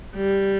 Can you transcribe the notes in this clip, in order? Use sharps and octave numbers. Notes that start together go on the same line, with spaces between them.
G3